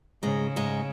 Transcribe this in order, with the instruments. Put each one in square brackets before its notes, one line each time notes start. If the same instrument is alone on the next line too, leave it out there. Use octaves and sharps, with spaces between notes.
[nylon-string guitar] G#2 G#3 [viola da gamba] C#3
[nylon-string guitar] G#2 G#3